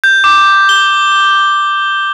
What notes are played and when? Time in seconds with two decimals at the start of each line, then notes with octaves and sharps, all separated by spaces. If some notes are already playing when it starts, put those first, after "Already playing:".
0.04 G6
0.24 D6
0.69 G7